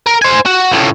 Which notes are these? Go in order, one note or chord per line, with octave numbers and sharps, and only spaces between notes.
A#4
C5 G#5
F#4
C#2 A2